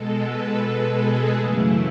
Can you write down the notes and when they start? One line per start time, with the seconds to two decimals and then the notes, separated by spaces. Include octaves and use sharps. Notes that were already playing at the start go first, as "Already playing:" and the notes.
Already playing: B2 G#3 A4
0.16 B4
0.57 A4
0.96 G#4
1.35 F#2 C#3 E3 A3 E4